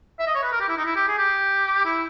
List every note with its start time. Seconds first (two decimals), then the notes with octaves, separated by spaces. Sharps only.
0.19 E5
0.27 D#5
0.35 C#5
0.43 B4
0.52 A#4
0.60 G4
0.69 E4
0.77 D#4
0.85 E4
0.96 G4
1.08 G#4
1.18 G4
1.85 E4